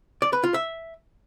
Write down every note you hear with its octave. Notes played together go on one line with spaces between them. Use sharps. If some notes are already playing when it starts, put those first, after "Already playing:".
D5
B4
F4
E5